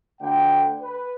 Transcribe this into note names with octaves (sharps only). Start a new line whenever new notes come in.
D2 D3 G5
B4